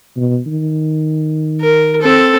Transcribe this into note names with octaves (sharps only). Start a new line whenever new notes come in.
B2
D#3
A#4
C4 A4